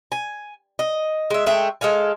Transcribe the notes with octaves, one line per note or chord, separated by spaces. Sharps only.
G#5
D#5
G#3 E5
G#3 A3 E5 G5
G#3 A4 F5 G#5